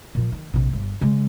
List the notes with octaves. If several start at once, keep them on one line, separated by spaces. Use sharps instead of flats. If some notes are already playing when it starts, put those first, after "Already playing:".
A#2 F3
D#3
A#1 C3
G1
C#3 G#3